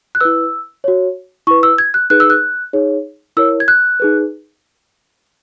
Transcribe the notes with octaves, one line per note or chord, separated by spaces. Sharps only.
F#6
E4 B4 E6
F#4 C#5
E4 B4 C#6
E6
G#6
F#6
D#4 G#4 B4 F#6
E6
F#6
D#4 G#4 C#5
E4 A#4 C#5 E6
G#6
F#6
D#4 G#4 B4